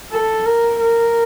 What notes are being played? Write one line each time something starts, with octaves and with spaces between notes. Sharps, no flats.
A4
A#4
A#4